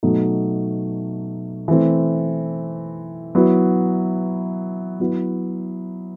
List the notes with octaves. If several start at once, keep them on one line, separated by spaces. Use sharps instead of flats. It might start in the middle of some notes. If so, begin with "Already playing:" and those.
B2 F#3 A3 D#4
E3 A3 C4 E4
F#3 B3 E4
F#3 B3 E4